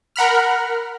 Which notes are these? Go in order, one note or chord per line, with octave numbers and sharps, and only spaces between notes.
A#4 F#5 B5 F6